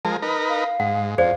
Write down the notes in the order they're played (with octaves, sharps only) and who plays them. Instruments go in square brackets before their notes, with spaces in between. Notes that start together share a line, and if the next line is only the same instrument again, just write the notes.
[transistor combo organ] F3 G#3 A#4 [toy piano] A5
[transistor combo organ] D#4 A#4 B4
[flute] F5
[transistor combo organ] G#2 [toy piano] F#5
[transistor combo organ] F2 [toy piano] G#4 C5 D5 [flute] F5